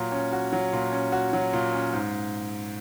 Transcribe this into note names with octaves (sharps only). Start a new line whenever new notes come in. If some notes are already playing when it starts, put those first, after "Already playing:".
Already playing: A#2 F#3 F#4
C#4
F#4
F#3
A#2
C#4
F#4
F#3
A#2
C#4
G#2